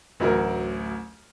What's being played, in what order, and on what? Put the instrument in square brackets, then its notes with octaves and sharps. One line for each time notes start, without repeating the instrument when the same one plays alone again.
[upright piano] A1 D2 F#3 A#4